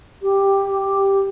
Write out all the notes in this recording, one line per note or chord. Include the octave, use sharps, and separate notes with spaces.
G4